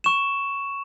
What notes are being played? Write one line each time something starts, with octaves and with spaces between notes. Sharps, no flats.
C#6 E7